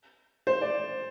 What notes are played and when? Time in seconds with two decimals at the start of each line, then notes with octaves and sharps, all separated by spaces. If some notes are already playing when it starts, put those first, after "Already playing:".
0.47 C5
0.61 D5